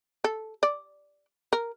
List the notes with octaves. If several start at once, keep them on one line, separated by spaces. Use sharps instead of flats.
A4
D5
A#4